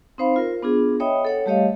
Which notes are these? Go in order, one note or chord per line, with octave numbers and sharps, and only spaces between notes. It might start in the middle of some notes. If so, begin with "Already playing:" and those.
C4 D#4 C5 F5 B5
F4 A#4
B3 D4 F4 G#4
C#5 D#5 E5 G5 B5 D#6
A4 C#5 F#5
G3 A3 G4 C#5 D#5 F5